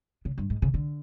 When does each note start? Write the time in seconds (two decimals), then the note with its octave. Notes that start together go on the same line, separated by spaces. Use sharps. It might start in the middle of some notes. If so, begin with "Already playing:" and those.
0.25 C#3
0.38 G2
0.50 G#2
0.62 C#3
0.74 D3